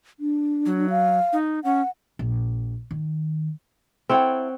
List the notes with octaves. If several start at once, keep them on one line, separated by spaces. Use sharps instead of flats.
D4
F#3
F5
D#4
C#4 F#5
A#1
D#3
C4 E4 A4 C#5 F#5 G5